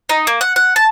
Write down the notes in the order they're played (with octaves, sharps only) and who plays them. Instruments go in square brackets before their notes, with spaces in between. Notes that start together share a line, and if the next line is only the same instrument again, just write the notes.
[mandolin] D#4
A#3
F#5
F#5
A5